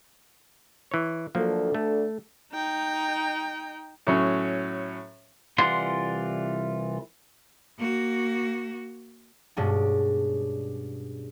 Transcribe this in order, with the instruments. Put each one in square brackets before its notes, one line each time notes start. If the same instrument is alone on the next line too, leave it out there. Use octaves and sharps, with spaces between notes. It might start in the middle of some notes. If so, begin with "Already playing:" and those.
[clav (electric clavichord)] E3 C#5
[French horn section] D2 D4 A4 [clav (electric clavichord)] F3 F#3 A#3
[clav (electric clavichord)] A3
[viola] D#4 G5
[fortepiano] A2 F#3 C#4
[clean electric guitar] C2 E3 F4 D5 F#5 C6
[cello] A#3 F#4
[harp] G2 B2 G#3 C#4 D4